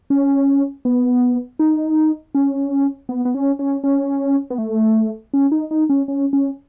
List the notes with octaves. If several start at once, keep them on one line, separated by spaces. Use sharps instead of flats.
C#4
B3
D#4
C#4
B3
B3
C#4
C#4
C#4
B3
A3
C#4
D#4
D#4
C#4
C#4
C#4